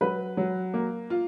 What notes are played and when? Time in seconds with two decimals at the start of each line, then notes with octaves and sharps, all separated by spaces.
0.01 F#3 B4
0.37 F#3
0.74 A#3
1.10 F4